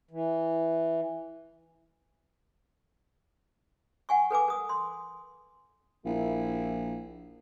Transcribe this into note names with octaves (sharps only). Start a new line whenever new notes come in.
E3
F#5 G#5 C#6
A4 B4 G#5 D6
A#4 D#6
C6
A#1 A#3 E4